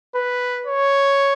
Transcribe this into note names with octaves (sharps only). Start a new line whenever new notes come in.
B4
C#5